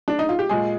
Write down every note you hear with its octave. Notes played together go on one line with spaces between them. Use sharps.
D4
D#4
F4
G4
A#2 G#3 G#4